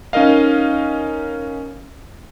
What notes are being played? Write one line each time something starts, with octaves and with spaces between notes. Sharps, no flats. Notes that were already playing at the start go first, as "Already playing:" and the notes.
C#4 D#4 A#4 D#5 F5